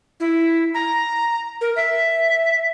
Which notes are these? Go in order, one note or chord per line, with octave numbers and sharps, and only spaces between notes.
E4
A#5
A#4
E5